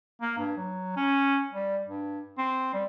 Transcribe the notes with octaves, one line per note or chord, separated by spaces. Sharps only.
A#3
G2
F#3
C#4
G3
G2
C4
G3